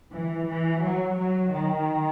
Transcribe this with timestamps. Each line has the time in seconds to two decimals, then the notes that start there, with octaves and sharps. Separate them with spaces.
0.12 E3
0.47 E3
0.82 F#3
1.17 F#3
1.52 D#3